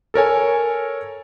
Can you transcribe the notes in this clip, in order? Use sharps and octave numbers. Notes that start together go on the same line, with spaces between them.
A4 A#4 C#5 G#5